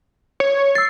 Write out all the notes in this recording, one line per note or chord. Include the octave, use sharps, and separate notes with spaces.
C#5
E6 A6 C7